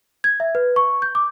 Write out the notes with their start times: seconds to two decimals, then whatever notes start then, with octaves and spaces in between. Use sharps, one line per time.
0.24 G#6
0.40 E5
0.55 B4
0.76 C#6
1.02 G6
1.15 D6